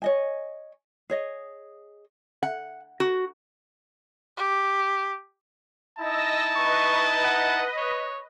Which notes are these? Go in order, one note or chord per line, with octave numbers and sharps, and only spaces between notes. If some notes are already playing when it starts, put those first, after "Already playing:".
C#5 D#5 G#5
G#4 C#5 D#5
F#5
F#4
G4
D#4 E4 D#5 A5 E6 A#6
B4 D#5 C#6
F#5
C#5